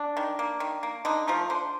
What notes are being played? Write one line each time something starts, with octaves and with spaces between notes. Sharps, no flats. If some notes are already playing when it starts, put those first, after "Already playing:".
Already playing: D4
D#3
A#3
D#3
A#3
D3 D#4
F3 A3 A#4
D3 C5